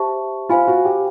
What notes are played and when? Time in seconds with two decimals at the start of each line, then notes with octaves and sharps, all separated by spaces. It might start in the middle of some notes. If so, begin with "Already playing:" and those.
Already playing: G4 C5 E5 A5 C#6
0.49 F4 C5 F5 G#5 B5
0.67 F#4
0.85 G4